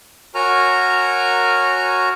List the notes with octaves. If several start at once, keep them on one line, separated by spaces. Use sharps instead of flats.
F#4 A#4 C#5 G#5 A#5 F6